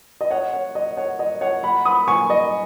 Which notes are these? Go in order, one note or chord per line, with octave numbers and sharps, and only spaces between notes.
D#5
C#5 F#5
C#5
D#5
C#5 F#5
D#5
C#5 F#5
F#5 B5
B5 D#6
G#5 C#6
D#5